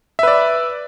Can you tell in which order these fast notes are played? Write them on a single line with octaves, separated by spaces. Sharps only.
E5 B4 D5